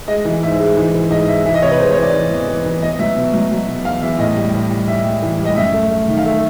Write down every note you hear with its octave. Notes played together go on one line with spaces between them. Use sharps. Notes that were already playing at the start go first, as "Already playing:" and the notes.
G#3 D#5
E3
G#2 E5
G#3
E3
E3
G#2 D#5
G#3 E5
E3 E5
D#5
C3 C#5
B4
G#3 C5
C#5
E3
D5
E3
E2
E3
E3
B3 D#5
F#3 E5
B2
F#3
F#3
B2
E2 F5
E2 E5
A2 D#5
G3
A2
G3
G3 E5
G3
E3
G3
D#5
F#2 E5
A3
A3
D#3
F5
A3 E5